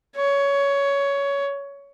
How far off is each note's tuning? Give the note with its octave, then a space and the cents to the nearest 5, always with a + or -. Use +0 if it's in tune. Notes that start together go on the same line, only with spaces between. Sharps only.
C#5 +15